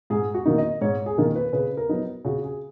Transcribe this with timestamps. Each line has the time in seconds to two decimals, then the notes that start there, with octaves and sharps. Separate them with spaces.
0.10 G#2 G#4
0.34 F#4
0.45 D#3 A#3 D#4
0.58 D#5
0.81 G#2 C#5
1.06 G#4
1.18 D#3 A#3 D#4 A#4
1.36 B4
1.53 C#3 B4
1.77 A#4
1.89 F#3 B3 D#4
2.25 C#3 F#4
2.43 G#4